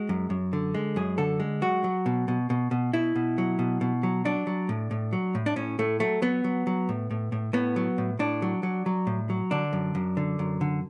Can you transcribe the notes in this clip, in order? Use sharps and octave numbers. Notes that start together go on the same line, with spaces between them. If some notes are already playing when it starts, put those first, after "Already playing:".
Already playing: G#3 F#4
F#2
F#2
D3
G#3
F#2 G#4
D3 A4
G#3
F#3 F#4
F#3
B2
B2
B2
B2
B2 E4
B2
F#3
B2
B2
F#3
F#3 D4
F#3
A2
A2
F#3
A2
D4
A2 C#4
A2 A3
F#3 A3
F#3 B3
F#3
F#3
A2
A2
A2
A2 B3
F#3
A2
A2 D4
F#3
F#3
F#3
A2
F#3
D3 D4
F#2
F#2
D3
F#2
D3